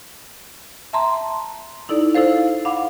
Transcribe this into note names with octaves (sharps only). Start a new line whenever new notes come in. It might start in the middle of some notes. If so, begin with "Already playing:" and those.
E5 A5 A#5 C6
D#4 E4 A4 D5
E4 F4 A4 C5 F5
F5 F#5 B5 D6